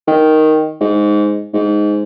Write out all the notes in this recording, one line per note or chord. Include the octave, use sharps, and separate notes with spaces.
D#3
G#2
G#2